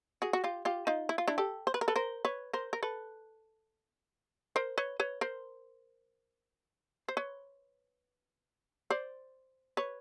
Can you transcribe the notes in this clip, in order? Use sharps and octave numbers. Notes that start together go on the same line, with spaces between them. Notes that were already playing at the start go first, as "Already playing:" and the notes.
F#4 G#4
F#4
F4 G4
F4 G4
D#4 F4
E4
F4
D4 E4
G4 A4
C5
B4
A#4
A4 B4
A#4 C5
B4 C#5
A#4 C5
A#4
A4 B4
A#4 C5
B4 C#5
B4 C#5
A#4 C5
C5
B4 C#5
C5 D5
B4 C#5